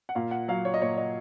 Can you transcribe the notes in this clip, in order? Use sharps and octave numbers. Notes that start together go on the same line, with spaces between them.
F#5
A#2 F5
F#5
F#3 F5
C#5
D#5
A#2 C#5
D#5